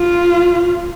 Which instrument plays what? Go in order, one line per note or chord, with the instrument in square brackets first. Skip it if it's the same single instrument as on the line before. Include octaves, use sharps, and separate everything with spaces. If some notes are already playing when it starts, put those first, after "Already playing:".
Already playing: [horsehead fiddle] F4